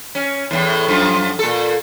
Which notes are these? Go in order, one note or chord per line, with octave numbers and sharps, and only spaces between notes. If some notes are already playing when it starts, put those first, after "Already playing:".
C#4
E2 A2
F#2 F3
A#2 A4